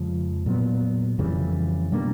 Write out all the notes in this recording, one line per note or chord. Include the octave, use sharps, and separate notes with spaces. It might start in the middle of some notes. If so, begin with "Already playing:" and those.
Already playing: F2 C#3 F3 G#3
A#2 F#3 B3
F2 C#3 E3 G3
B2 G3 A#3 D4